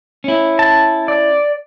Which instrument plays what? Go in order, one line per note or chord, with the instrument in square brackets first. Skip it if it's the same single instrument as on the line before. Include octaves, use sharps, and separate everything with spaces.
[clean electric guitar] C#4 E4
[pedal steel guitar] A5
D5